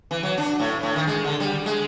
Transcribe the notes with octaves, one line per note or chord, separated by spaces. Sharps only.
E3
F#3
D4
A2
A2
D#3
G#3
D3
G3
G#3